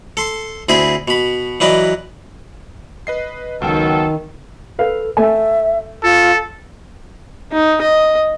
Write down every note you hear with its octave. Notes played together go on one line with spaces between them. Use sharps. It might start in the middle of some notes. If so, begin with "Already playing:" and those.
A4 C6
D2 C4 E4 G#4 B5
B2 B5
E3 F#3 B4 D5 D#5
B4 D#5 C7
C#2 D#3 F#3 B3 A4 G5
A4 B4 F5
A3 E5 G#5
F4 A4
D#4
D#5